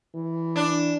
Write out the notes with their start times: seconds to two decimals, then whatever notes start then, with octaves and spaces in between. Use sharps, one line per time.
0.15 E3
0.56 D4